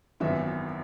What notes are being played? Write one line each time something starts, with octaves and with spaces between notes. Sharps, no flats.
G#1 F#2 E3 B3 E5